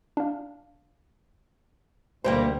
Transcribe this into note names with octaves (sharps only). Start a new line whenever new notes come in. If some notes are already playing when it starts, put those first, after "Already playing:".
D4 F5
D2 B2 G3 A#3 C5 G5